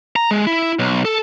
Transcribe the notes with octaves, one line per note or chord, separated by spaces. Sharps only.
A#5
G#3
E4
B1
A4